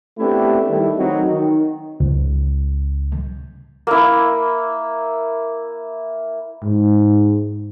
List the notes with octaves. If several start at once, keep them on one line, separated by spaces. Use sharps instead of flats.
A3 B3 C4 D4 E4 G4
D#3 G3 A3 E4
D#3 F#3 C4 D#4
D#3
C#2
A#3 E4
G#2